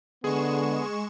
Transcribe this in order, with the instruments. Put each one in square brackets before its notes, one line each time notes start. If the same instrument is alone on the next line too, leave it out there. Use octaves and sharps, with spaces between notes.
[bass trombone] D3 [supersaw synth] G#3 C#6 E7 [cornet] B3 [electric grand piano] G#4